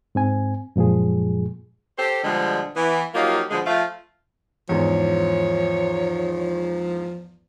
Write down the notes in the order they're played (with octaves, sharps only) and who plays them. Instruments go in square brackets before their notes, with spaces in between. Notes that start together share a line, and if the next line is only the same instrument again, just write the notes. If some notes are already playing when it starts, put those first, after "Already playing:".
[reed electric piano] G#2 C4 G#5
F#2 A#2 F3 G#3 G#4
[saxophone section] G4 A4 C5
B2 D3 F3 G3 G#3
E3 B3
F3 F#3 A#3 D#4 F4 G4
B2 D3 F3 G#3
F3 A3 F4
[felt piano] E2 G#2 [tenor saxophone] F3 [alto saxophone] C#5